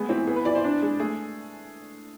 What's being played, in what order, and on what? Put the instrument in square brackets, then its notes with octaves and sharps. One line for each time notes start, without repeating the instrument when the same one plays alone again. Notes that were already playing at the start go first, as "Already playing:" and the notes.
Already playing: [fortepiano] G#3 [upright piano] A3 B3
[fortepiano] E3 [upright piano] C4
[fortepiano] B3 [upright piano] G#4
[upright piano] B4
[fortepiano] E3 [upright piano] D5
[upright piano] C5
[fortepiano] D4
G#3
[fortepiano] A3 [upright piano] G#4